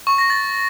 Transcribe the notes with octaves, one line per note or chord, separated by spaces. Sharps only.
C#6
A#6
A6